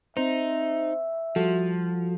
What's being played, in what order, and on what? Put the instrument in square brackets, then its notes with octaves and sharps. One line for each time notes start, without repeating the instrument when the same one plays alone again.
[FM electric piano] C4 C5 [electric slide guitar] D#4 [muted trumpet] E5
[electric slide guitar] F3 [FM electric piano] G3 F#4 A4